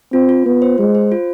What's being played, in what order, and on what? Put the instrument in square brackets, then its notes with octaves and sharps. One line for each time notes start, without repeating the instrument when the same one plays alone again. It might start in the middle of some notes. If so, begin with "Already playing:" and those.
[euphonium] C4 [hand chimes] F4
[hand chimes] F4
[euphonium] B3 [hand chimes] F4
[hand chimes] C5
[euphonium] G#3 [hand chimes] C5
[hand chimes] C5
F4